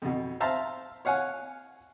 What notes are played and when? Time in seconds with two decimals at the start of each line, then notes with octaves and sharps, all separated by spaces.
0.02 F2 B2
0.40 C5 E5 F5 A5 A#5 C6
1.05 C#5 F5 F#5 G#5